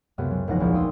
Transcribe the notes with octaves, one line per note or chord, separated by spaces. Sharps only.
C#2 F#2 C3 B3
F#3 C#4
E1 C#2 F3 D#4 F#5 A#6
A#1 E2 F3
G5 C6 D#6 E6